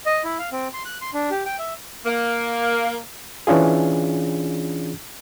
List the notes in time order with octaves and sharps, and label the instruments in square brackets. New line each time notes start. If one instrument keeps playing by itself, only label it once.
[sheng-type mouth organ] D#5
E4
F5
C4
C6
F#6
C6
D4
G4
G5
E5
[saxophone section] A#3
[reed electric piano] E3 C#4 D4 F4 G#4